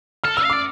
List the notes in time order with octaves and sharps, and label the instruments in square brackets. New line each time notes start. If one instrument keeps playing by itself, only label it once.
[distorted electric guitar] A4 [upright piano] F6
[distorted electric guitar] A#4 [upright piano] E6
[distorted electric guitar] F5
[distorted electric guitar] D5 [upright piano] D6